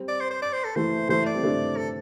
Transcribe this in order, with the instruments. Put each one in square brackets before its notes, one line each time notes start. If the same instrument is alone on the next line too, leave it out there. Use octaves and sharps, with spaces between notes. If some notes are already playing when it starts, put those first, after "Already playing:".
Already playing: [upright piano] G3 C4
[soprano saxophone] D5
C5
C5
D5
C5
A4
[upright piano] E3 A3 [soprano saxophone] C5
[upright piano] E3 A3 [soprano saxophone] C5
[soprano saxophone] D5
[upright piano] G3 C4
A3 D4
[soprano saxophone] A4